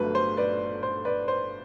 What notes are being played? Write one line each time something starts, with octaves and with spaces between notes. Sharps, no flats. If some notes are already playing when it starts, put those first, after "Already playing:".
Already playing: G1 G2 F#3 A3 B4
C5
B4 D5
C5
B4 D5
C5